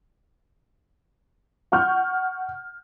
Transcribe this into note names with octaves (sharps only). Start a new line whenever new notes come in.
F#5 C#6 F6 G6